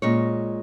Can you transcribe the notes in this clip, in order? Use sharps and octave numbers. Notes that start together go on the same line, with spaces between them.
A#2 G#3 C#4 C#5